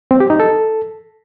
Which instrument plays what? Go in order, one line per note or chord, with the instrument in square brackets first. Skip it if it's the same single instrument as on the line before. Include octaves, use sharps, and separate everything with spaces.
[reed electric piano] C4
G4
D#4
A4